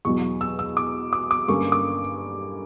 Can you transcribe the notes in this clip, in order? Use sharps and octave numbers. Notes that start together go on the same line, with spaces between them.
E2 B2 F#3 C#6
E6
E6
D6
D6
D6
G2 D3 A#3 C#4 C#6
D6